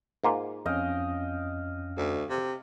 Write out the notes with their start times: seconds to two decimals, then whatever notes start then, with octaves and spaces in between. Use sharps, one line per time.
0.24 G#2 A#3 F4
0.66 F2 C#4 D#5 F5 G5
1.97 D2
2.30 C3